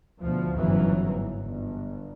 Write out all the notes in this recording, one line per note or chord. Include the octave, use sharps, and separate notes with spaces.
D2 B2 F3
G1 F2 G#2 C#3 E3 F#3
G1